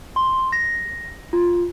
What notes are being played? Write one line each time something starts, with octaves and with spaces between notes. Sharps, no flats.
C6
A#6
F4